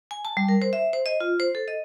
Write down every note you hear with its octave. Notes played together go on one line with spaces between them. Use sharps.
G#5
A5
G3
A#4
C5
E5
C5
D#5
F4
C5
A4
D#5